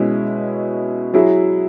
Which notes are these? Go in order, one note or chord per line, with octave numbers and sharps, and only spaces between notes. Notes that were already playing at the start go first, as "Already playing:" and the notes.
Already playing: B2 G#3 C#4 E4
F#3 E4 G#4